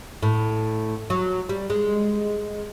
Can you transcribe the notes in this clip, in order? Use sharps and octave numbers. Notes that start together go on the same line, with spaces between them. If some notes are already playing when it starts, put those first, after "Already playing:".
A2
F#3
G3
G#3